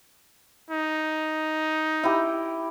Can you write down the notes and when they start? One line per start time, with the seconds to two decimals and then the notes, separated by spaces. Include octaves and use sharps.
0.70 D#4
2.03 E4 G4